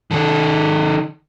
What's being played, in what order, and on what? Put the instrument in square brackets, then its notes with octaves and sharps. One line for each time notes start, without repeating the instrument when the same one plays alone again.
[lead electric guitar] D#3 A4